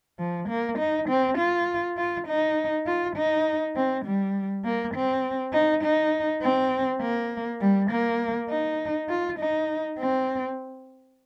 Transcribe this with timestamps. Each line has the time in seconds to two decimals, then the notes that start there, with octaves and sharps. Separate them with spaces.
0.19 F3
0.49 A#3
0.79 D#4
1.09 C4
1.38 F4
1.97 F4
2.27 D#4
2.86 F4
3.16 D#4
3.76 C4
4.05 G3
4.64 A#3
4.94 C4
5.53 D#4
5.84 D#4
6.42 C4
7.01 A#3
7.61 G3
7.91 A#3
8.50 D#4
9.09 F4
9.39 D#4
9.99 C4